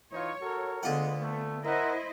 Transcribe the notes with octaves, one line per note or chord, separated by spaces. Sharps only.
E3 D#4 F4 C#5
F#4 A4 A#4
D2 G#3 B3 F4 F#5
A3
E4 A#4 C5 D#5 E5 F#5